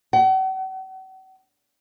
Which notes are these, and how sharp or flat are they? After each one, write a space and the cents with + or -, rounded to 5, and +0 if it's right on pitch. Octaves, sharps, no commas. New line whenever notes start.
F#5 +45